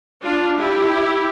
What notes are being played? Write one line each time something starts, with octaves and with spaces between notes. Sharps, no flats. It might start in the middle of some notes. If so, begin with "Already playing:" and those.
D4 F4
E4 G4